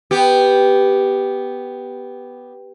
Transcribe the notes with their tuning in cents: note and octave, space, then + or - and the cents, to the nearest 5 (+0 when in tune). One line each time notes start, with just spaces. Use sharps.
B3 +0 G4 +0